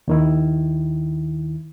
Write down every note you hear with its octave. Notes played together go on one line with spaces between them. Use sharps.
D#2 D#3 E4